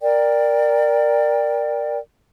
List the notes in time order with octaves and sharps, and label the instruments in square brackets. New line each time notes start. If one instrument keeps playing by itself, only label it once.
[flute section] A#4 D5 G5